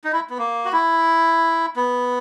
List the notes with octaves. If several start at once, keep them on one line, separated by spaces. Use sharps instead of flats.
D#4
E4
B3
A#3
F#4
E4
B3